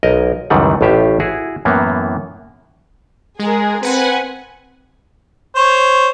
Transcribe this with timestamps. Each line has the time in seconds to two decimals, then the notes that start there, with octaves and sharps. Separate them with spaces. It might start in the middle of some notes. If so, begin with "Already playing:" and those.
0.03 B1 A#4 D#5
0.50 C#2 F#2 D#3 E3 G3 F#5
0.81 A1 A2 F4 G4 E5
1.20 E4 F#4 G#4
1.65 F#2 A2 E3 A#3 B3
3.39 G#3 G#4 A#4
3.83 C4 B4 F#5 G#5
5.55 C5 C#5